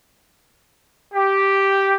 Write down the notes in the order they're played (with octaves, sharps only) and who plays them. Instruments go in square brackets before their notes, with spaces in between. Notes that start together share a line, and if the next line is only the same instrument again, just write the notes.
[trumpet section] G4